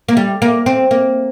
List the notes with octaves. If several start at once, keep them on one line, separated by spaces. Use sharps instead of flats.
A#3
G3
A#3
C4
A#3